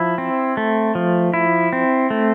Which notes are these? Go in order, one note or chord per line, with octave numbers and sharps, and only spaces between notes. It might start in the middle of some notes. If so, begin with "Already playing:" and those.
Already playing: F3 E4
C4
A3
F3
E4
C4
A3